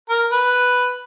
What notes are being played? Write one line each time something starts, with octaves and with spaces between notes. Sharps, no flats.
A#4
B4